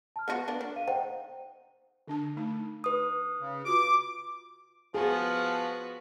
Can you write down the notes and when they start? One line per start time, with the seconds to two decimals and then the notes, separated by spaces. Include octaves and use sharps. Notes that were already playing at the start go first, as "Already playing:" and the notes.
0.16 A5 F6
0.28 B3 F4 F#4 A5
0.48 A#3 B3 D4
0.61 D4
0.76 F5 D#7
0.88 D#4 C5 F#5 G5
2.08 D3 D4 A5
2.37 A3 D#4
2.84 B4 D#6
3.40 C#3
3.65 F4 F#4 D6
4.95 F3 B3 F#4 G#4